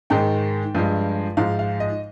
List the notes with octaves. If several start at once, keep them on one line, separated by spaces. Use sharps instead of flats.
G#2 D#3 G#3 G5
G2 F3 G#3
G#2 F3 G#3 F5
F5
D#5